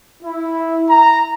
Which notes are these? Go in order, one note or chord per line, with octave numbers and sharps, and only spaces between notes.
E4
A#5